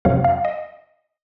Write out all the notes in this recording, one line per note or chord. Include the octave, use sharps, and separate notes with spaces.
F2 C3 F#3 C#4 F5
F5
D#5